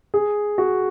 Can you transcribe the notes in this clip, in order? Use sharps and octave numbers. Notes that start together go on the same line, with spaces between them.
G#4
F#4